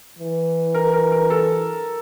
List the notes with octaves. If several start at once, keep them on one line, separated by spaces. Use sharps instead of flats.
E3
A#4
A#4
A#4
A4